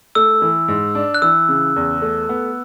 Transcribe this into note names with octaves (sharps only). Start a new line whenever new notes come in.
A3 E6
E3
G#2
D4
F#6
E3 E6
C#3
E2
A3
B3